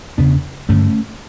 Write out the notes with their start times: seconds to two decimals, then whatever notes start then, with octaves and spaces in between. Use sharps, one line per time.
0.18 E2 C#3 B3 D4
0.69 G2 D3 A3 C#4